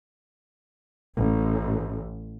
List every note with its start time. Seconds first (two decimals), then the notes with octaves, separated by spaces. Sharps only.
1.18 A1